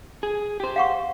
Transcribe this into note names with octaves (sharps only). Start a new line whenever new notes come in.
G#4
G4 C5
F5 F#5 C#6